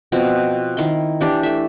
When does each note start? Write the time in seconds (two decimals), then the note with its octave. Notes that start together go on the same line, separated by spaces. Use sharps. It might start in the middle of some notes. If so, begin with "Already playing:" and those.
0.12 B2 F3 C4
0.77 D#3 E4 C6
1.21 E3 D4 G4
1.43 A3 E5